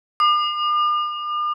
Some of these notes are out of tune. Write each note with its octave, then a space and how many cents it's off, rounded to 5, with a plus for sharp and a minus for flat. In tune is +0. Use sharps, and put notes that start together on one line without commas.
D6 +45